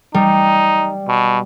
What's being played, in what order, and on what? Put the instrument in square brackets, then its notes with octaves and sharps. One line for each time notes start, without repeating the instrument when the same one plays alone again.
[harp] G3 [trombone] D#4
[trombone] B2